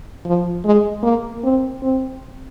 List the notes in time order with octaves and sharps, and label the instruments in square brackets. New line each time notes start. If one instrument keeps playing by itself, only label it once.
[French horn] F3
G#3
A#3
C4
C4